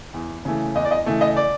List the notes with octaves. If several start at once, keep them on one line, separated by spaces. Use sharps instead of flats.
E2
C#3 E3 A3
E2 D#5
D5
D#5
C#3 E3 A3
D#5
D5